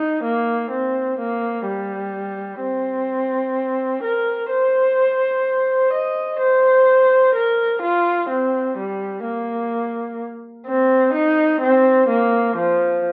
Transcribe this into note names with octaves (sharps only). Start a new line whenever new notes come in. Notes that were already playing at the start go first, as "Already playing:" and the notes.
Already playing: D#4
A#3
C4
A#3
G3
C4
A#4
C5
D#5
C5
A#4
F4
C4
G3
A#3
C4
D#4
C4
A#3
F3